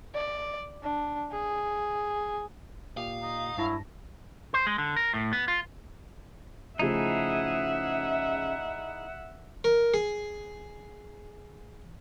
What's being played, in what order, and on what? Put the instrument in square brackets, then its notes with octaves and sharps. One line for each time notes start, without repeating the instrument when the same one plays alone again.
[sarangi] D5
D4
G#4
[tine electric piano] A#2 G4 D#6 [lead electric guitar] F5
[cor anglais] D#4
[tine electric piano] G2 A5 A#6 [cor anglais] F#3 [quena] E4
[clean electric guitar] C5
G#3
D3
A#4
A2
B3
F4
[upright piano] C#3 F3 A3 [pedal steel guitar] D#4 E4 G#4 [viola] E5 F#5
[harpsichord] A#4
G#4